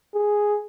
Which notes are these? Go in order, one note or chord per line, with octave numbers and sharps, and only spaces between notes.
G#4